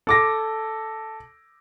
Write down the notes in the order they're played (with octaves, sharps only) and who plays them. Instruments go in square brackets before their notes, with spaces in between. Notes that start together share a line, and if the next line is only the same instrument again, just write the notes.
[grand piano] A4 D6 A#6